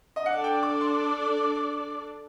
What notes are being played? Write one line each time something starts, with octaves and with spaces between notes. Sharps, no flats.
D#5
D4 A4 D5 F#5
G5
D6
C6